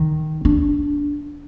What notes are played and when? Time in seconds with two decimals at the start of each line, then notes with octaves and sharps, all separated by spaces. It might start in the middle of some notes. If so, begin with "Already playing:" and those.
Already playing: D#3
0.45 D4